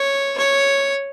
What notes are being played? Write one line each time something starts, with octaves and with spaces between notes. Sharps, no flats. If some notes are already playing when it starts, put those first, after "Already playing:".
Already playing: C#5
C#5